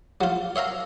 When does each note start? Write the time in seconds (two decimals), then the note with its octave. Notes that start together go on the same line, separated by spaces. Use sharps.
0.21 F#3 F4
0.56 C#5 E5 F5 A#5